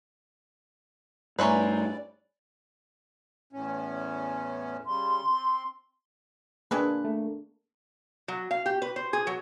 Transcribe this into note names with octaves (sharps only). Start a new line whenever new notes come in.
G2 A3 C#4 E4 B4 C5 D5 A#5
E2 A2 C#4
C#3 G3 C6
C4
G#3 A#3 D4 G#4 A4 B4 D5 G5
A3
F#3
F5
G4
B4
C5
G#4
F#3